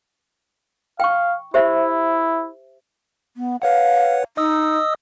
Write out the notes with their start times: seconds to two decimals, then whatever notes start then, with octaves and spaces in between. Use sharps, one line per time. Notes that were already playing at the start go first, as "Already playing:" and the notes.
1.00 F5 G5 C#6
1.54 E4 G4 C5 E5
3.37 B3
3.62 B4 C#5 F5 F#5
4.37 D#4 D#5 D#6 E6